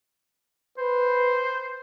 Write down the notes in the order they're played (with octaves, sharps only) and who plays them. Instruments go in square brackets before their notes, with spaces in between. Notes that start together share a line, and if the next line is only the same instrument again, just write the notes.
[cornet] B4 [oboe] C5